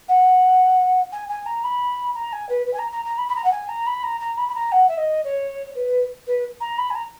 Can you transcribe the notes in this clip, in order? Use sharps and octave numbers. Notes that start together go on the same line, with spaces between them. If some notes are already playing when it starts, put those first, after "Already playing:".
F#5
G#5
G#5
A#5
B5
A#5
G#5
B4
B4
G#5
A#5
A#5
A#5
B5
B5
A#5
F#5
G#5
A#5
B5
A#5
A#5
B5
B5
A#5
F#5
E5
D#5
C#5
B4
B4
A#5
B5
G#5
A#5